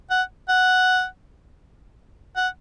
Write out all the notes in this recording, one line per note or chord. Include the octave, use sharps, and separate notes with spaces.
F#5
F#5
F#5